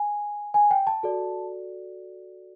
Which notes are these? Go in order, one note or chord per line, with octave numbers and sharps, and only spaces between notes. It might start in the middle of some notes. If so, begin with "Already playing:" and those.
Already playing: G#5
G#5
G5
A5
F#4 A4 D5